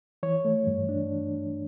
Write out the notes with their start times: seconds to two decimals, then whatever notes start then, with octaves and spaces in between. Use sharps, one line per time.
0.23 E3 C#5
0.45 A3
0.67 G2
0.89 D4